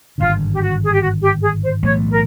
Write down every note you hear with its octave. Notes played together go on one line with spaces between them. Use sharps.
G#1 G2 D3 F4
G4
F#4
G#4
G4
F#4
G4
G#4
C5
B1 A2 E3 A3 C#5
A#4